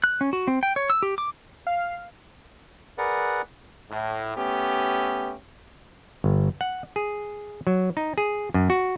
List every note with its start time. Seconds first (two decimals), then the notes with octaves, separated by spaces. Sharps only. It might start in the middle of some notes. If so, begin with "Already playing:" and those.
0.04 F#6
0.21 C#4
0.33 F#4
0.48 C4
0.63 G5
0.76 C#5
0.90 E6
1.03 G4
1.18 D6
1.67 F5
2.98 G#4 A#4 B4 D5 F#5
3.91 A2
4.37 A3 B3 C#4 G4
6.24 G1
6.61 F#5
6.96 G#4
7.67 F#3
7.97 D#4
8.18 G#4
8.54 F#2
8.70 F#4